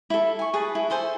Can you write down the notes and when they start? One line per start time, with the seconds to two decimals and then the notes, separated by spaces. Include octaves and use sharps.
0.10 E4 A4
0.39 G#5 C#6
0.54 G#4 B4 A5
0.75 E4
0.90 G#4 A4 C5 G#5